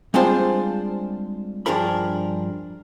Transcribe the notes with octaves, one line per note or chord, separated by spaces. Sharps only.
G3 G#3 C4 D4 F4 C5
G2 F3 D4 G#4 A#4 B5